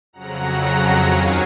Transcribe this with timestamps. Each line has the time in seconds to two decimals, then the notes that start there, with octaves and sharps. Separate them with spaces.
0.13 F2 C#3 F#3 F#5 A#5
0.96 D#2 D#3 F#3 F5 G#5